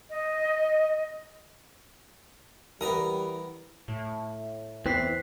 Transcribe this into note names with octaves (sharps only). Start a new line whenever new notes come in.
D#5
E3 G3 B3 A#4 A#5 D#6
A2
E2 E3 C4 F#6 B6 C7